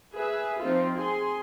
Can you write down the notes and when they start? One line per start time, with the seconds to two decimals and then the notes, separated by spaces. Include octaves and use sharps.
0.13 G#4 B4 E5
0.61 F3 C4 D#4 F4
0.96 G#4 C6